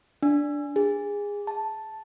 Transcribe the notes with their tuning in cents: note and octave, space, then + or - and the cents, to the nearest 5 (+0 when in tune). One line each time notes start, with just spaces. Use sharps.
D4 -5
G#4 -20
A5 +0